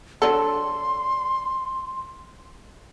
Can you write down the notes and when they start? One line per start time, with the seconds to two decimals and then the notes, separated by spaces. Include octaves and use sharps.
0.22 F#3 D4 A4 C6